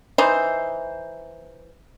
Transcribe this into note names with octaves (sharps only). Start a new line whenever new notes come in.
E3 D#4 C5